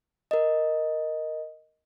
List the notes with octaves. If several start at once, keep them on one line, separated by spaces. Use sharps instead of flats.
A#4 D#5